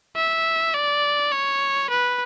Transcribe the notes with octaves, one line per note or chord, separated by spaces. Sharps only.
E5
D5
C#5
B4